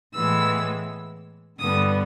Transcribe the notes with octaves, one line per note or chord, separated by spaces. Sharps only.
A2 E3 G#3 B3 E6
G2 D3 G3 B3 D#6